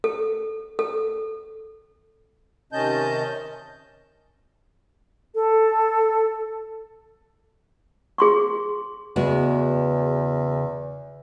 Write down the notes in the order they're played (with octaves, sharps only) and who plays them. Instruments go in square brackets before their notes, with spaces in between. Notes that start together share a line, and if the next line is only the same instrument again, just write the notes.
[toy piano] A4
A4
[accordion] C3 D#3 C#4 D#5 A5 G6
[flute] A4
[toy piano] G#4 C6 C#6
[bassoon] E2 [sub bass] C#3 [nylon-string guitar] G#3 B3 F#4